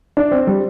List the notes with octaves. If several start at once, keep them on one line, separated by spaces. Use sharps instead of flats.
D4
C4
G3